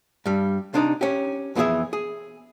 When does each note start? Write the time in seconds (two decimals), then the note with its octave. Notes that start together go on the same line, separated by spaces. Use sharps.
0.26 G2 G3
0.74 C3 D4 D#4
1.01 C#4 G4
1.55 F2 E3 B3 E4 G#4 E5
1.93 G#4